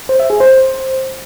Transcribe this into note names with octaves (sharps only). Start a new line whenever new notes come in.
C5
E5
G#4
C5